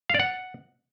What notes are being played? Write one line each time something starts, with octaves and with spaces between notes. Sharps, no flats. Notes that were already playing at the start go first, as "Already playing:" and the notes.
F5
D5
F#5